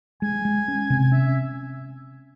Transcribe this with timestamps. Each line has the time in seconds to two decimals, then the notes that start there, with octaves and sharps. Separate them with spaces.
0.22 G#3 G#5
0.45 G#3
0.68 C#4
0.90 C3
1.12 C#4 E5